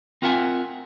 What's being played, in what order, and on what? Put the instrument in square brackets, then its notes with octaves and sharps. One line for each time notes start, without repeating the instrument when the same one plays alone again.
[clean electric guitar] C4 F4 A#4 E5 F#5 G#5